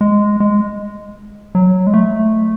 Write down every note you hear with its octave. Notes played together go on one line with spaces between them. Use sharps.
G#3
G#3
F#3
G#3
A3